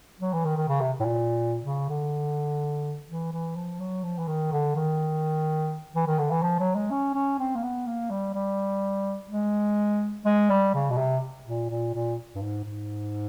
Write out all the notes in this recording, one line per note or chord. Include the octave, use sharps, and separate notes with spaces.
F#3
E3
D#3
D#3
C#3
C3
A2
A#2
C#3
D3
E3
E3
F3
F#3
F3
E3
D#3
D3
D#3
E3
D#3
D3
E3
F3
F#3
G#3
C#4
C#4
C4
A#3
B3
A#3
G3
G3
G#3
G#3
G3
C#3
B2
C3
A#2
A#2
A#2
G2
G#2
G#2